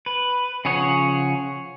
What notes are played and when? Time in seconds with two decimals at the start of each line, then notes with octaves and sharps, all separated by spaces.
0.06 B4
0.65 C#3 F3 G#4 C#5 F#5